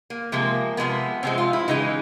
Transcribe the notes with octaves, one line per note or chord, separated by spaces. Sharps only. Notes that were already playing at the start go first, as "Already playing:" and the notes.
A#3
C3 F3 G#3 A#3
C3 F3 G#3 B3
C3 F3 G#3 C4
F4
E4
C#3 E3 G#3 D#4